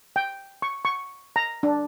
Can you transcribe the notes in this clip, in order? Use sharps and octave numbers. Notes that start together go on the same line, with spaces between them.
G5
C#6
C#6
A#5
D4